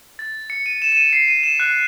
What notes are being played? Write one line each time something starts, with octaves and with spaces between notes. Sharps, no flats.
A6
C#7
D#7
E7
E7
D#7
C7
D#7
E7
F#6